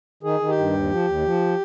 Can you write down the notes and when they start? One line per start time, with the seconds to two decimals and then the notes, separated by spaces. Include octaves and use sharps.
0.23 D#3 G#4
0.40 D#3
0.49 G4
0.58 G2
0.73 D#2
0.90 F3
1.08 D#2
1.25 F3